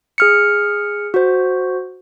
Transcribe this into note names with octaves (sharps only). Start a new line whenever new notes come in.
G#4 F6 C#7
F#4 C5